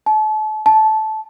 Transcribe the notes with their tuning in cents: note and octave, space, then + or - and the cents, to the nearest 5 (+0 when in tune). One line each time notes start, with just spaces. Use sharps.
A5 -35
A5 -15